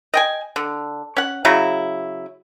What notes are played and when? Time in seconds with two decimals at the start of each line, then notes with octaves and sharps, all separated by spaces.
0.14 D#5 G5 G#5
0.56 D3
1.17 C#4 F#5
1.45 C#3 F#3 E4